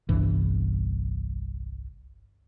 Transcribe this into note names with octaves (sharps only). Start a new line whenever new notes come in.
G1 C2 G2 E3